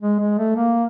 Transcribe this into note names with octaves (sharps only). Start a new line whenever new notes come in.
G#3
G#3
A3
A#3